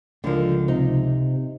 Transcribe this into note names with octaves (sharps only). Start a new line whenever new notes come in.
C#2 D3 F3 A#4
C3 D#4